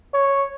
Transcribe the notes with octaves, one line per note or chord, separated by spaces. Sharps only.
C#5